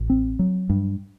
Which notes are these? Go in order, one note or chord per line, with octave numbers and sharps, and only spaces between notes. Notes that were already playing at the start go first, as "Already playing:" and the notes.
Already playing: A1
C4
F#3
G2